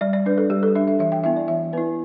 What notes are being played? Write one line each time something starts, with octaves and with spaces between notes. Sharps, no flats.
G3 D5
D5
D4 B4
A4
G3 G4
A4
D4 E5
E5
E3 E5
G5
B3 E4 E5
D5
E3 E5
B3 E4 B4